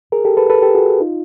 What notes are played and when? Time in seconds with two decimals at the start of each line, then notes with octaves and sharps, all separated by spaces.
0.12 G#4 A#4
0.25 G4 A4
0.37 A4 B4
0.50 A4 B4
0.62 G4 A4
0.75 F#4 G#4
1.00 D#4 F4